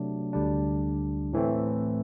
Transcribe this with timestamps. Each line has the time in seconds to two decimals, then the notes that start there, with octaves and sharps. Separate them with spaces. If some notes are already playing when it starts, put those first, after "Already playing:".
Already playing: C3 F#3 A3 D4
0.33 D2 D3 G3 D4
1.33 A2 E3 A3 C4